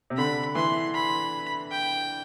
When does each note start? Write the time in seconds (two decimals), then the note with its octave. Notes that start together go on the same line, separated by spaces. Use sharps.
0.10 C3
0.17 D3 B5
0.55 E3 C6
0.94 B5
1.71 G5